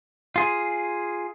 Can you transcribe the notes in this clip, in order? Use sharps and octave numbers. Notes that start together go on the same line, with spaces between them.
F4 G#4